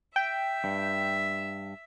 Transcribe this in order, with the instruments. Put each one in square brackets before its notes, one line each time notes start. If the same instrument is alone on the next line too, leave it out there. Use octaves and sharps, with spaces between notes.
[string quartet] E5 [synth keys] G5
[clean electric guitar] G2